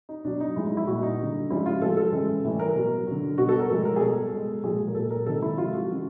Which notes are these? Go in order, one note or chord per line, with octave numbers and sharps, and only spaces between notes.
D#4
B2 F#3 D4
D#4
A2 F3 G#3 E4
D#4
E4
A#2 G3 F#4
D#4
D3 G3
C#3 F3 G#3 E4
F4
A2 F3 G#3 A4
A4
C#3 E3 G#3
A2 E3 G3
A#4
B2 F#3
D3 F#3
B2 G3 F#4
A4
A#4
A2 F3 G#3 A4
A#4
G#4
B2 G3 A4
B2 G#3
A#2 F3 G#3 G#4
A#4
A#2 F#3 A4
A#4
C3 D#3 G#3 A4
E4
C3 F3 G#3 F4
F#4
C#3 E3 G#3